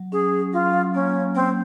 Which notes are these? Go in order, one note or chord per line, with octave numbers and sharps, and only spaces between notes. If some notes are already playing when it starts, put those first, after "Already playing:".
Already playing: F#3
C#4 G#4
F#3 F4
A#3 C#4
A#3 C4